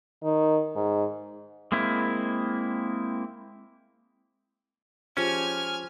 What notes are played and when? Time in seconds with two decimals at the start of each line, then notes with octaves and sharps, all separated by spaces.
0.23 D#3
0.76 G#2
1.72 G#3 A#3 C4 E4
5.17 F3 G#3 C#4 G4 G#5 F6